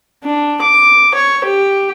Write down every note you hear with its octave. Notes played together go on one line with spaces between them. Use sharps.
D4
D6
C#5
G4